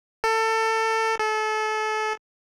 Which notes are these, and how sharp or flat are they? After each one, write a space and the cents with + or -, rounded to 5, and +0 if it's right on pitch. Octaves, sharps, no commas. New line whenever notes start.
A4 +25
A4 -30